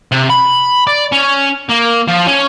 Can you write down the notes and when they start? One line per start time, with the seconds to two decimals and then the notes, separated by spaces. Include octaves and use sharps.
0.12 C3
0.30 B5
0.87 D5
1.12 C#4
1.69 A#3
2.08 F3
2.27 C#4